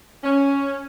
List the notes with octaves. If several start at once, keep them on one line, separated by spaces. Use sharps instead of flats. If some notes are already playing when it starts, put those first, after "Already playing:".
C#4